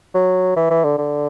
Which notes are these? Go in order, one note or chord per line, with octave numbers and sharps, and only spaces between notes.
F#3
E3
E3
D3
D3